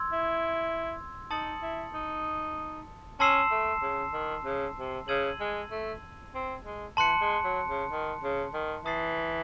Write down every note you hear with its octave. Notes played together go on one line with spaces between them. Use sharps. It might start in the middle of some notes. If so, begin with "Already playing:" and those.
Already playing: C6 E6 G#6
E4
D#4 A5 D#6 A6 C#7 F#7
E4
D#4
C#4 A5 C6 E6 C7 E7
A3
C#3
D#3
C#3
C3
C#3 E6 G#6 D#7 F#7
G#3
A3
C4
G#3
E3 A5 C6 F#6 C#7
G#3
F#3
C#3
D#3
C#3
D#3
E3 A5 D#6 A6 C7